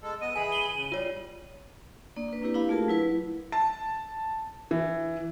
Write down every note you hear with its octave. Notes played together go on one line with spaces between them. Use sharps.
G#3 A4
B3 D#5 D#7
E3 G#4 G#5 B5
F#7 G7
C#3
G3 F4 C#5
A#3 D4 D5
D4 B4
A#3 C4 D4 E4 G4 B4
D4 E4 G4 F5 B5
A3 F4 G#4 A#4 A5
F#3 E4 B4
A5
E3